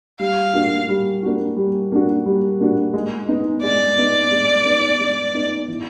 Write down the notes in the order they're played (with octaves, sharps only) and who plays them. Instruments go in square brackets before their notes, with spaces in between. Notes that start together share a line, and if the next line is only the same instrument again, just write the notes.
[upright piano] G3 [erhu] F5
[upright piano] A#3 D4 F#4
G3
A#3 D4 F#4
G3
A#3 D4 F#4
G3
A#3 D4 F#4
G#3
B3 D#4
[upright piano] G#3 [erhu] D5
[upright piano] B3 D#4
G#3
B3 D#4
G#3
B3 D#4
E3